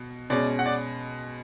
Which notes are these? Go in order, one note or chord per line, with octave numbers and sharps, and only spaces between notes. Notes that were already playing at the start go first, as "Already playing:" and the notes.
Already playing: B2
B2 G#3 C#4 D5
F#5
D5